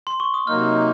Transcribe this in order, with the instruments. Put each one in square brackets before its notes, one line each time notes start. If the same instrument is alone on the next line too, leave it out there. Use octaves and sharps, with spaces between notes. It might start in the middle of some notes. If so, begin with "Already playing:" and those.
[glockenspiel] C6
C#6
D#6
[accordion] C3 F#3 A#3 D#4 [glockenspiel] F6